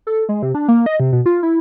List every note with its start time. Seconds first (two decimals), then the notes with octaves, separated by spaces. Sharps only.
0.07 A4
0.29 G#3
0.43 C3
0.55 D4
0.68 A#3
0.86 D#5
1.00 C3
1.12 B2
1.26 F4
1.43 E4